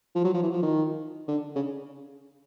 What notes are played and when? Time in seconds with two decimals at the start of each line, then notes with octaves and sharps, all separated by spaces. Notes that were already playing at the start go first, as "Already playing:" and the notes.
0.15 F3
0.24 F#3
0.34 F3
0.43 E3
0.53 F3
0.62 D#3
1.28 D3
1.56 C#3